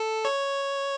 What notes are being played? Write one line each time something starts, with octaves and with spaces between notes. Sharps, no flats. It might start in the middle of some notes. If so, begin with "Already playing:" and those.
Already playing: A4
C#5